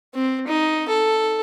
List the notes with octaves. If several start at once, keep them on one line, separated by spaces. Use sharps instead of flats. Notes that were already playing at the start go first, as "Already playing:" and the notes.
C4
D#4
A4